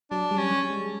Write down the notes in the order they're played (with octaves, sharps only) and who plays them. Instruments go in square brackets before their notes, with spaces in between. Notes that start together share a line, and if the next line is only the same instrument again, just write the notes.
[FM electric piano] F#3 [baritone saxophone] D4
[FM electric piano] G3
[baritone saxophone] C#4
[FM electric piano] G3
G#3